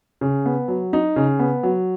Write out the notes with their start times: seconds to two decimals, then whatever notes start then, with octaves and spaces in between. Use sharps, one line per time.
0.21 C#3
0.46 B3
0.68 F#3
0.93 D#4
1.16 C#3
1.39 B3
1.63 F#3